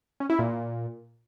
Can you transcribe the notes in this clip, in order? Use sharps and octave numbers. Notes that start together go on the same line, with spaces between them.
C#4
E4
A#2